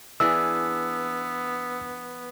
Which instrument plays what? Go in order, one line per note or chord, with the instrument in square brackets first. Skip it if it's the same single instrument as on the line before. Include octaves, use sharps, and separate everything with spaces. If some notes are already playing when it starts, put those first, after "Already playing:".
[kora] E3 D4 G#4 [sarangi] B3 [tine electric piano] E6